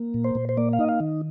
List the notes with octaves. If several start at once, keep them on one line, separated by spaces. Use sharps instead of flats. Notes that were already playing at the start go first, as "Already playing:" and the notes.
Already playing: A#3
A#2
C5
A#2
C5
A#3 D5
F5
D#4 D#5
F5
D#3